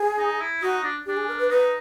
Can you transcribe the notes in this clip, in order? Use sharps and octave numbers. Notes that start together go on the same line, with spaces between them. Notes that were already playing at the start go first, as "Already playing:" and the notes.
Already playing: G#4
D#4
E4
D#4 F#4
D4
D4 G4
G#4
A#4
B4
D#4 B4